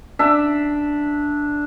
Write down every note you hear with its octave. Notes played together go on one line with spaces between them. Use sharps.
D4 E5